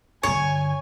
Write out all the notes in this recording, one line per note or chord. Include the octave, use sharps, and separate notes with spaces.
G2 D3 C#5 G#5